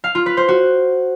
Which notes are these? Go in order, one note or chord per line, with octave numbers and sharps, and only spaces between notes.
F5
F4
B4
C5
F#4